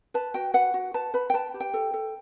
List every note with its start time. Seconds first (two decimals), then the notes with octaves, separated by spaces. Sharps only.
0.14 B4 A5
0.34 F#4 G5
0.54 B4 F#5
0.74 F#4
0.94 B4 A5
1.14 B4 B5
1.30 G5
1.34 B4 A5
1.54 G4
1.60 G5
1.74 A4
1.94 A4